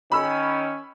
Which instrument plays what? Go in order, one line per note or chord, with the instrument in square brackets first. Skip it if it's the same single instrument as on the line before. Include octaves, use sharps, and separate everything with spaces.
[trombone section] D#3 C#4 [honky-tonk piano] B5 E6